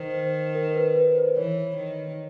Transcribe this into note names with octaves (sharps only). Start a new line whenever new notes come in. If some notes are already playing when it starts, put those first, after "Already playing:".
Already playing: D#3 C5
C5
A#4
B4
B4
C5
E3 C#5
D#3